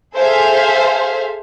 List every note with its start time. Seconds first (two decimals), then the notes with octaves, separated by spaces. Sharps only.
0.15 G#4 A4 C5 E5 F5